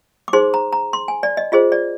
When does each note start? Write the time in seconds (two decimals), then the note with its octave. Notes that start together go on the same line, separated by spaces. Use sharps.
0.28 D6
0.33 D#4 G#4 C5 C6
0.54 A#5
0.73 A#5
0.93 C6
1.08 G#5
1.23 D5
1.37 D#5
1.52 F4 G#4 C5 D#5
1.72 D5